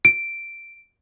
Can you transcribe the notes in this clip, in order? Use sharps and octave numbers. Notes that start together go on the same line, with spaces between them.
D7